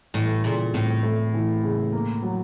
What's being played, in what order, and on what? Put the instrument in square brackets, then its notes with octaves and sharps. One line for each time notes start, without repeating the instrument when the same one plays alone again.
[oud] A2 [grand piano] E3
[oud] A#2 [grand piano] C#3
[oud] A2 [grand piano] C4
[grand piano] A3
E3
C#3
A#3
F#3